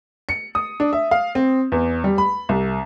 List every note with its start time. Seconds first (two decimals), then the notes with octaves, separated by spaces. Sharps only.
0.29 C#7
0.55 D#6
0.80 D4
0.93 E5
1.11 F5
1.35 C4
1.72 E2
2.04 G3
2.18 B5
2.49 C2